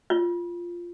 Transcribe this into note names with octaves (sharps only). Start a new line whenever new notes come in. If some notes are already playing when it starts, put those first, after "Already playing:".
F4